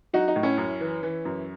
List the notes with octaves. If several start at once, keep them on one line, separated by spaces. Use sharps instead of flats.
F#3 D#4 F#4
D#4
A2
C#4 E4
F#2
E3
E3
F#2